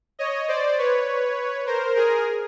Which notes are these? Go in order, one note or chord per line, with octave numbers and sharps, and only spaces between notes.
C#5 D#5
C5 D5
B4 C#5
A#4 C5
G#4 A#4